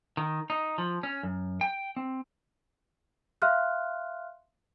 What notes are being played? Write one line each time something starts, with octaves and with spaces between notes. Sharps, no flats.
D#3
D#4
F3
C#4
F#2
G5
C4
E5 F5 C6 F6 F#6